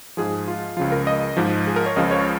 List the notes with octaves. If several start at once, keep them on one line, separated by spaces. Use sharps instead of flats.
G#2 F3 G#4
F4
C#2 C#3 F3 F4
A#4
D#5
G#2 F3
G#4
A#4
C#5
C#2 C#3 F3 D#5
C#5